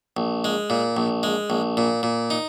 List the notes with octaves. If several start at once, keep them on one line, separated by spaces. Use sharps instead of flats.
A#1
G#3
A#2
A#1
G#3
A#1
A#2
A#2
D#4